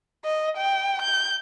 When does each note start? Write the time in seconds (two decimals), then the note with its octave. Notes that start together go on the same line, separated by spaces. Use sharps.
0.25 D#5
0.57 G5
1.01 G6